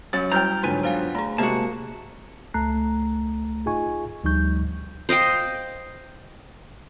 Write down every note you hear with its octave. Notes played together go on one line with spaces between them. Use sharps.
F#2 C#4 A6
G3 E4 F#4 G5 A#5 F6 G6
G#2 D3 F#3 F4 B4 G#5
B3 F4 C5 F5 G#5
A3 G#4 A#5
C3 G#3 A#3 F#4 A5
C#2 A3 A5 A#5 F#6 C7
D#4 F4 G#4 D#5 G#5 C#6
D2 F3 G3 D#4 C#6 G6
C5 D#5 F5 G5